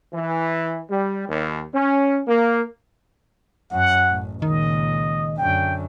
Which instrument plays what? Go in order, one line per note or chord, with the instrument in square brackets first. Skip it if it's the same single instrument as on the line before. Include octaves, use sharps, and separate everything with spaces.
[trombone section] E3
G3
D#2
C#4
A#3
[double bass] F#2 [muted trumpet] F#5
[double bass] A1
[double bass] C#2 A#2 [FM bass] D#3 [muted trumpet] D#5
[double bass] F#2 D3 [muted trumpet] G5